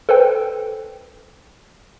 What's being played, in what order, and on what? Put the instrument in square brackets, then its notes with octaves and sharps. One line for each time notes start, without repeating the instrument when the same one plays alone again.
[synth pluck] A4 B4 C5 G5